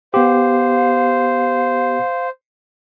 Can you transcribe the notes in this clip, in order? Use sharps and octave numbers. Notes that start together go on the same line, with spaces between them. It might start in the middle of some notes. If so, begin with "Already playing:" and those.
B3 G4 C5 F5